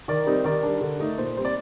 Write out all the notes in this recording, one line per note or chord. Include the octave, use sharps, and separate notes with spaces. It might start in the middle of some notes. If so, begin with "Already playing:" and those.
D#3 A#4 D5
G3 C4 D#4
D#3 A#4 D5
G3 D4
D3
A3 D#4
A#2 C5
G3 C4 C5 D5